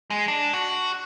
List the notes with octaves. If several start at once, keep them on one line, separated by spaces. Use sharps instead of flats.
G#3
D4
F#4